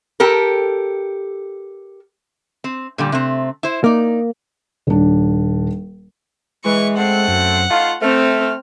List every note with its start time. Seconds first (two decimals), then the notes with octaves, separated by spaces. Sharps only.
0.20 G4 A4 A#4
2.64 C4
2.98 A#2 D3 G3
3.12 C3 A3 C4
3.63 E4 C5
3.84 A#3 D#4 D5
4.87 D#1 D4
6.65 E3 G#3 C#6
6.97 A3 C4 F#5
7.28 F#2
7.70 A3 D#4 F4 F5
8.02 A3 C4 F6